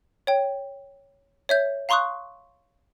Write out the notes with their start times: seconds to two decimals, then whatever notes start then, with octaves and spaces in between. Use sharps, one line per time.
0.27 C#5 G5
1.49 C#5 E5 G6
1.89 F5 A#5 C6 C#6 D#6 F#6